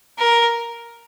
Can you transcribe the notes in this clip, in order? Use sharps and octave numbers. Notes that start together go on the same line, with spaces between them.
A#4